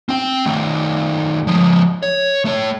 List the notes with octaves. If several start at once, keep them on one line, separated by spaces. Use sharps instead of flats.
C4 G5
D#3 A3
F3 G#3
C#5
A3 C#5